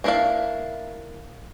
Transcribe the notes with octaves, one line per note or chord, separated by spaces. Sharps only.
A#3 D4 E4 E5 F5